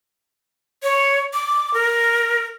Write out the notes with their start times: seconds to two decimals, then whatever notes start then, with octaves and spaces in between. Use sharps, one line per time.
0.83 C#5
1.33 D6
1.74 A#4